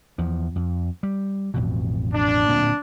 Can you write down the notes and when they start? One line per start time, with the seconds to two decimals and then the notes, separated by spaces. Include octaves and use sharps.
0.18 E2 F3
0.56 F2
1.03 G3
1.54 A1 F2 B2
2.13 D4
2.49 D1 A#2 C4